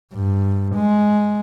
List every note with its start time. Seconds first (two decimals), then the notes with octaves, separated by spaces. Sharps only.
0.14 G2
0.75 G#3